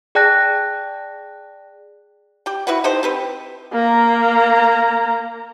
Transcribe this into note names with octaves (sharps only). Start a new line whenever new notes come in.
G#4 D5 G5 A5 F#6 A#6
G4 G5
E4 F#4 B4 F#5
D#4 G4 A4 C5
C4 G4 B4
A#3 A#5